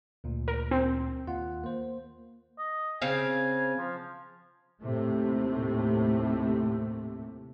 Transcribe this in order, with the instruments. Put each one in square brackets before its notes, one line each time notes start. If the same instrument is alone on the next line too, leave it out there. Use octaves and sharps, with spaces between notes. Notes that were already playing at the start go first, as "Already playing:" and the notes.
[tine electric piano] D2 A#2
[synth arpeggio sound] A#4
C4
[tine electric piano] D#2 F4 F#5
A#3 C5
[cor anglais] D#5
[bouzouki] C#3 C4 F5 [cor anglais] G#5
[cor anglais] F3
[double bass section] D#2 A2 C3 A3